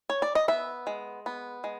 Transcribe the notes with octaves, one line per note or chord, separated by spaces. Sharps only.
C#5
D5
D#5
B3 E5
G#3
B3
G#3